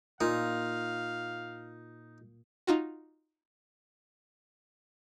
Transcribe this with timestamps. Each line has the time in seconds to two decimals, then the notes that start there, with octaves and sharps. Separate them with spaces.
0.21 A#2 D#4 F4 F5
2.67 D#4 F4 F#4